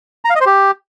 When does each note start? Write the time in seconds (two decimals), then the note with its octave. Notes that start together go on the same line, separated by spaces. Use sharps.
0.25 A#5
0.30 F5
0.35 D#5
0.41 C5
0.46 G4